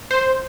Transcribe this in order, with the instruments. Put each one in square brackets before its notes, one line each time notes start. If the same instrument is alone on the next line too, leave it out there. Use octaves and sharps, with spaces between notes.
[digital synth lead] C5